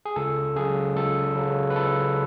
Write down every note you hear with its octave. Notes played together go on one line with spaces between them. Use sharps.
G#4
C#2 A4
C#3 F#3 G#4
C#2 A4
C#3 F#3
B4
C#2 A4